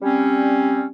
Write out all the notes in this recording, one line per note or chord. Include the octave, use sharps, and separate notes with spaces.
G3 C4 C#4